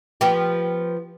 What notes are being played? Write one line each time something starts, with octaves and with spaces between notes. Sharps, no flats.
F3 B3 G4